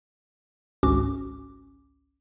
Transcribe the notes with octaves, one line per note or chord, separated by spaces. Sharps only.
G#1 C#2 G#2 C#4 F#4 D6